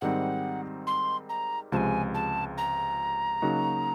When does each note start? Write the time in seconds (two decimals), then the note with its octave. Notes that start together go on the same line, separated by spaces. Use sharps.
0.01 G#2 D#3 G3 C4 D#4 F#5
0.87 C6
1.29 A#5
1.72 C#2 C3 F3 G#3 G#5 A5
2.14 A5
2.58 A#5
3.42 C#3 F#3 A#3 D#4 F#4